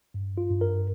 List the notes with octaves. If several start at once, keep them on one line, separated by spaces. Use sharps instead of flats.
G2
F4
G2
A#4